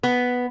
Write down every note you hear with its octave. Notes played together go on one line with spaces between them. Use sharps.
B3